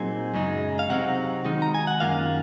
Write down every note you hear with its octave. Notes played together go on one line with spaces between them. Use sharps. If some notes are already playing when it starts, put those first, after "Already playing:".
Already playing: A#2 F#3 C4 D#4 G#4 G#5
F#2 C#3 G#3 D#4
F5
C3 F#3 C4 D#4 F#4 F#5
D#3 G#3 D#4
A#5
G#5
F#5
F#2 D#3 A#3 F4 F5